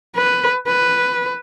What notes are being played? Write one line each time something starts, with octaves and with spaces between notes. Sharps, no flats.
B4
B4